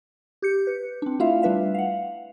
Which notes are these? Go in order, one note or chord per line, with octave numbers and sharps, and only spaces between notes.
G4 G6 C#7
B4
C4 D4
A3 E4 F4 E5 F5
G3 D4 B4 E5 F5
F5 F#5